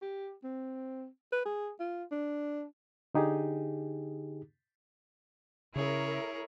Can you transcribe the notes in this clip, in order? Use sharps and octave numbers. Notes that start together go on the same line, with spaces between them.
G4
C4
B4
G#4
F4
D4
D3 D#4 G4 G#4
C#3 E4 G#4 A#4 C#5